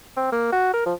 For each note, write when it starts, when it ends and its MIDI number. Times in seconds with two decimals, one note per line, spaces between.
0.17 0.29 60
0.32 0.48 58
0.53 0.73 66
0.74 0.85 70
0.86 0.94 53